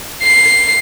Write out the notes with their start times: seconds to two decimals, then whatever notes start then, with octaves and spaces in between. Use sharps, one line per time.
0.22 C7